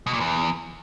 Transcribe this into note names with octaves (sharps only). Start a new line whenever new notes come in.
B2
A#2
E2